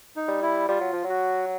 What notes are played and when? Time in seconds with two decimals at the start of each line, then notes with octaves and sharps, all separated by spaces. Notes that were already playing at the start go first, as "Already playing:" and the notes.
0.16 D#4
0.28 G3
0.42 E4
0.69 G3 F4
0.81 F#3
0.93 F3
1.04 F#3
1.09 F#4